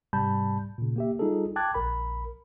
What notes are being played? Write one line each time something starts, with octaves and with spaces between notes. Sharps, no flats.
G#2 C3 G3 A5 B5 G6
A#2 C#3
A#3 G4 E5
G3 D#4 F4 G#4 A4
G5 A5 D6 F#6 G#6 A6
A#1 A#4 B5